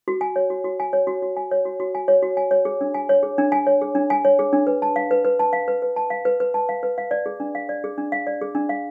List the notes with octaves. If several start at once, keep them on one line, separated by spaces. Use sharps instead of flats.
F#4
G#5
C#5
F#4
F#4
G#5
C#5
F#4
F#4
G#5
C#5
F#4
F#4
G#5
C#5
F#4
G#5
C#5
G#4
D4
G#5
C#5
G#4
D4
G#5
C#5
G#4
D4
G#5
C#5
G#4
D4
B4
A5
F5
B4
B4
A5
F5
B4
B4
A5
F5
B4
B4
A5
F5
B4
F5
D5
G#4
D4
F5
D5
G#4
D4
F5
D5
G#4
D4
F5